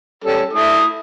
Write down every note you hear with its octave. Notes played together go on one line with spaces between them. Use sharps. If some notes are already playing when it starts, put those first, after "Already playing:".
G3 C#4 A4
A3 E4 D#6